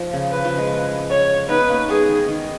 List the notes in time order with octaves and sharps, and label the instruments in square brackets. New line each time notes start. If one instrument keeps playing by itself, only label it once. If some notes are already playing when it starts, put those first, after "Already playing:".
Already playing: [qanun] F3
C#3
[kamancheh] B4
[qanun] F3
G#3
[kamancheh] C#5
[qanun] B3 D#4 [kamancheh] B4
[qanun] A#3 C#4
[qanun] G#3 B3 [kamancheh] G#4
[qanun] D#3
D#3